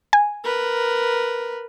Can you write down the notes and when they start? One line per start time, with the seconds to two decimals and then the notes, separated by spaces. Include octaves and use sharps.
0.13 G#5
0.43 A#4 B4